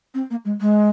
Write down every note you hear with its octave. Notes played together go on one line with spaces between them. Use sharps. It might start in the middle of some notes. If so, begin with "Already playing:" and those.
C4
A#3
G#3
G#3